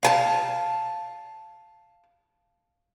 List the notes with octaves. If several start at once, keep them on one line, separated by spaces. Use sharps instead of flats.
F5 G#5 A5